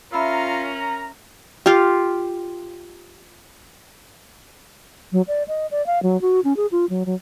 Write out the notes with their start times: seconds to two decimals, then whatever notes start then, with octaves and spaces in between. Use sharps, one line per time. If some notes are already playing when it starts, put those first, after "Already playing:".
0.12 C#4 F4 A#4 E5 A#5 B5 E6
1.66 F4 G4
5.12 F#3
5.28 D5
5.48 D#5
5.71 D5
5.86 F5
6.03 F#3
6.21 F#4
6.44 C#4
6.56 G#4
6.71 F4
6.89 F#3
7.06 F#3